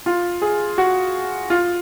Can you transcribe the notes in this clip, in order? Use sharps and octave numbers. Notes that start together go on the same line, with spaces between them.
F4
G#4
F#4
F4